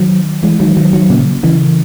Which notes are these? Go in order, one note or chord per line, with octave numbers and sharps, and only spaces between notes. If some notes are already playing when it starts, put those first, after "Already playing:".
Already playing: D#3 F#3
E3 G#3
D#3 F#3
D#3 F#3
D#3 F#3
A#2 C#3
C#3 E3